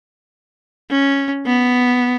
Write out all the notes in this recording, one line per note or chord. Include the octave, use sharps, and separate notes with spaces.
C#4
B3